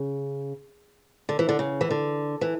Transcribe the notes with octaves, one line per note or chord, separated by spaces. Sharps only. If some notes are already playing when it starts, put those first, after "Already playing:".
Already playing: C#3
D3
E3
D3
C#3
E3
D3
E3